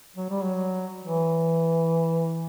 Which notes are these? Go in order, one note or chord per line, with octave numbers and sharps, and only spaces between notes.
F#3
G3
F#3
E3